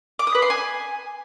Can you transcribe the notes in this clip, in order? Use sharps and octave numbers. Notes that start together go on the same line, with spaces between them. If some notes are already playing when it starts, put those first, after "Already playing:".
D6
D#6
B4
C6
G#5